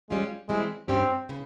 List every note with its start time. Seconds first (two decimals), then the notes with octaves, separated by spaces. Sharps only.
0.10 G3 G#3 C#4 F4
0.49 E3 G3 G#3 C4 E4
0.88 G2 G3 C4 C#4 G4
1.29 C#3 E3